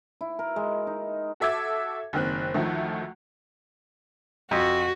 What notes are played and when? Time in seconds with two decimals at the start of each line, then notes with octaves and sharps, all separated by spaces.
0.21 E4
0.39 A#4
0.56 G#3
0.87 D#4
1.40 F#4 A4 E5 D6 G#6
2.13 F#1 D#3 C4 F#6
2.54 D2 D#3 F3 A3
4.51 F2 F#4